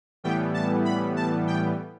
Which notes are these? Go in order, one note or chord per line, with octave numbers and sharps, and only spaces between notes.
A2 E3 G3 B3 G5
A5
B5
A5
G5